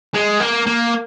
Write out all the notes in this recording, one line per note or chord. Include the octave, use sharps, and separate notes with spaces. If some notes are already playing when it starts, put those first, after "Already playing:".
G#3
A#3
A#3